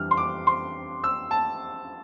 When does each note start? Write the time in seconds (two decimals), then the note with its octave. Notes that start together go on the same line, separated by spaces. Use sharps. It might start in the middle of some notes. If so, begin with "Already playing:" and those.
Already playing: F2 E3 G3 D4 F6
0.11 C6
0.17 D6
0.47 C6
1.04 E6
1.31 A5